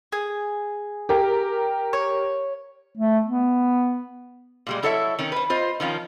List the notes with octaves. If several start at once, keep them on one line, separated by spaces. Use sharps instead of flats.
G#4
G4 A#4
C#5
A3
B3
A#2 G3 G#3
F#3 E4 A4 C#5 D#5 E5
D#3 C#4
B4 C5
F4 C5 D#5
D#3 F3 C#4 F4